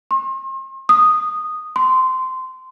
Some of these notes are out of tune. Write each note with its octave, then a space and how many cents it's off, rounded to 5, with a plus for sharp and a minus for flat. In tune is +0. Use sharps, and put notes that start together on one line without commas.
C6 +40
D#6 -10
C6 -15